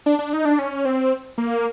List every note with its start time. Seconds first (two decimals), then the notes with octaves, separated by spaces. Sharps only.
0.06 D4
0.19 D4
0.33 D#4
0.45 D4
0.59 C#4
0.85 C4
1.38 A#3